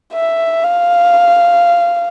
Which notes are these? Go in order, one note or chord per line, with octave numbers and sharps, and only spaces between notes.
E5
F5